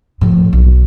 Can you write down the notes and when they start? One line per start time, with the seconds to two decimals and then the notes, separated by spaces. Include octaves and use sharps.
0.21 A2 F3
0.53 B1